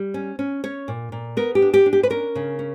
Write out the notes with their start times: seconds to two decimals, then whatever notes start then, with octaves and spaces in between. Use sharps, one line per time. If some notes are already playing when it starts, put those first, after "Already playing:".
Already playing: G3
0.14 C#4
0.39 C#4
0.64 C#4 C#5
0.88 A#2
1.12 A#2
1.37 B3 A#4
1.55 G4
1.62 D4
1.74 G4
1.86 D4
1.93 G4
2.03 B4
2.10 C#4 A#4
2.35 C#3
2.59 C#4